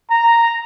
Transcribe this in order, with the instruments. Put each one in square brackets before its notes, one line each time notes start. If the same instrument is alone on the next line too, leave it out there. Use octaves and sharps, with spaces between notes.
[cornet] A#5